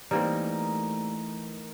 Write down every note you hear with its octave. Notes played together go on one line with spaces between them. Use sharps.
E3 G3 A3 A#3 C4 D#4 A#4 D#5